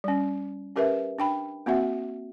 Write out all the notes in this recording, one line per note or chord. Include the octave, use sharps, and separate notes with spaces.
G3 C#4
C#4 G4 A#4 B4 E5
D4 G5 B5
A#3 C4 F#4 E5 F#5